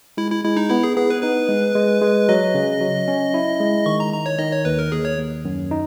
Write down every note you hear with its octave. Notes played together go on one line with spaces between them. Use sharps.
G#3 E4
E4
G#3 E4
D#4
B3 E4
G#4
B3 G#4
B4
D#4 B4
G#3
G#3
G#3
F#3 D#5
C#3
F#3
C#4
E4
G#3
D#3 C#6
A#5
D#3 A#5
C#5
D#3 D#5
C#5
D#2 B4
A#4
D#2 G#4
C#5
D#2
F#2
D#4